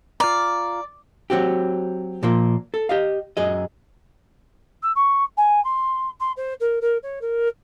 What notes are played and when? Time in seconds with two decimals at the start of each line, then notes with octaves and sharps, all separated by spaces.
0.20 F4 D5 A#5
1.30 F#3 C4 F#4 G4
2.23 A#2 F3 A#3 F4
2.74 A4
2.89 G4 D#5 F5
3.37 F#2 G#4 D#5
4.82 E6
4.95 C#6
5.37 G#5
5.64 C6
6.20 C6
6.36 C5
6.60 A#4
6.81 A#4
7.02 C#5
7.21 A#4